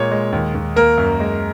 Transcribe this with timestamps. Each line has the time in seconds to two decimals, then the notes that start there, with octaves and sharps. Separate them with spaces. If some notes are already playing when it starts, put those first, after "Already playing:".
Already playing: A#2 G#3 C#5
0.11 G#3
0.32 D#2
0.54 D#2
0.76 A#3 A#4
0.98 F#2
1.20 G#3